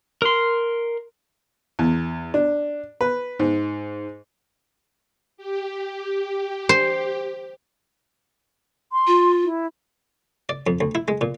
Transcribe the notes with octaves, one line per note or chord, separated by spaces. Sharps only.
A#4 C6
E2
D4
B4
G#2
G4
C5
C6
F4
E4
D5
F2
D2
E4
G#3
A#2